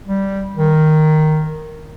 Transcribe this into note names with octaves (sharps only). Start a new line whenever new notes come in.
G3
D#3